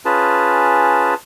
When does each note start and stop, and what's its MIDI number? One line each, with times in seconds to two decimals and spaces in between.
0.05 1.14 61
0.05 1.14 65
0.05 1.14 68
0.05 1.14 71
0.05 1.14 81